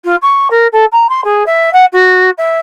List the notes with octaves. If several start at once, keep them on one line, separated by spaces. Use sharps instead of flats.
F4
C#6
A#4
A4
A#5
C6
G#4
E5
F#5
F#4
E5